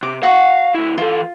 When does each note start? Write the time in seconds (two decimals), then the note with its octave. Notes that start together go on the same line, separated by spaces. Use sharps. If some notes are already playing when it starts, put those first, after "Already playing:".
0.03 C3 D6
0.23 F#4 F5 F#5 C#6
0.74 D2 E4
0.98 E3 F4 A4